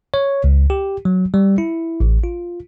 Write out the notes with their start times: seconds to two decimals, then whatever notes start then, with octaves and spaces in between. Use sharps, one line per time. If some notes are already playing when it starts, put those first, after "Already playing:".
0.14 C#5
0.44 C#2
0.70 G4
1.05 F#3
1.34 G3
1.58 E4
2.00 A1
2.24 F4